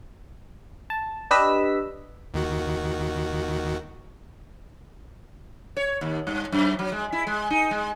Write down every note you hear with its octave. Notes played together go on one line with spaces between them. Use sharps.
A5
D4 G4 B4 D#5 E6 B6
D#2 D#3 F#4
C#5
D#2
G2
F#2
F#3
G#3
E4
G#3
D#4
G#3